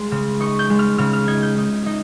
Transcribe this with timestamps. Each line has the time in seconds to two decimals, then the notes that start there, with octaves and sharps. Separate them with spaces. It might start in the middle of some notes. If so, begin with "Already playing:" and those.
Already playing: G#3 C6
0.12 C#3
0.40 D#4 C#6
0.59 G6
0.70 G#3
0.79 F6
0.98 C#3 F6
1.13 F6
1.28 D#4 G#6
1.42 G6
1.58 D#4
1.86 D#4